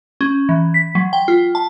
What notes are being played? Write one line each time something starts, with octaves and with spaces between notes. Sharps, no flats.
C#4
E3
B6
F#3
G5
F4
A5